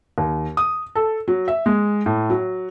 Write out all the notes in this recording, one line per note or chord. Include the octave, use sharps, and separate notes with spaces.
D#2
D#6
A4
F#3
E5
G#3
A2
F#3